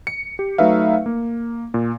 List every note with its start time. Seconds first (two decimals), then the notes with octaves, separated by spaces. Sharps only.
0.07 C#7
0.39 G4
0.58 F#3 A3 D#4 B4 E5 F5
1.06 A#3
1.74 A#2